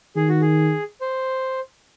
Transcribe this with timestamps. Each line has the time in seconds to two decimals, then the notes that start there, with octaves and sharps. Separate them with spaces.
0.16 D#3 G#4
0.29 F#4
0.41 G#4
1.01 C5